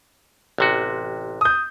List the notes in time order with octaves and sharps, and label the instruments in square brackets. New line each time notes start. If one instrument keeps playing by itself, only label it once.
[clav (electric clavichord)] A1 C3 F#4
[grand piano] D#6 G6